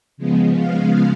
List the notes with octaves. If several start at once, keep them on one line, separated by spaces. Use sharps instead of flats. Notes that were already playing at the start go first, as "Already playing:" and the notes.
C#3 F3 G#3 B3
F5